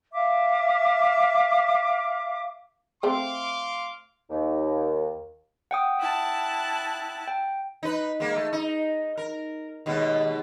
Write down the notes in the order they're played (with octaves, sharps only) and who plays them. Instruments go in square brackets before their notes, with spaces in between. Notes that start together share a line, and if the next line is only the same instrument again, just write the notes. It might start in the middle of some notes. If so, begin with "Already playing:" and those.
[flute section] E5 F5 D6
[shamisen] A3 C4 [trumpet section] F5 C6 D6
[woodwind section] D#2
[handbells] F#5 G5 D#6
[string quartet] E4 A5 F#6
[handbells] G5
[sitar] D#4 B4
G#3 A#3
A3
D#4
A#4
D#2 B2 G#3